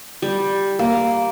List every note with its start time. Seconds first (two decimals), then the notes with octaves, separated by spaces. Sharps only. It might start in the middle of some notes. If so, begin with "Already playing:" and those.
0.22 G3
0.79 A#3